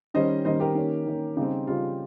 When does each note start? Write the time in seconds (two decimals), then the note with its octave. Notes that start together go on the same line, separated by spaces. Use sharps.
0.14 D#3 G3 C#4 C5 D#5
0.45 D#3 G3 C#4 C5 D#5
0.60 G4 A#4
0.75 D#3 A#3 C#4
1.06 D#3 A#3 C#4
1.36 C#3 G3 C4 D#4 G4
1.67 C#3 G3 C4 F4